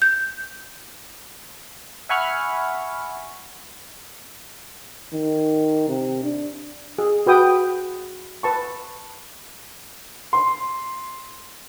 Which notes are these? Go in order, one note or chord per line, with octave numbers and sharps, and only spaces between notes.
G6
E5 F#5 G#5 B5 C#6 F6
D#3
C3
D4
G#4
F#4 B4 G5 D#6
B4 A5 C#6
C6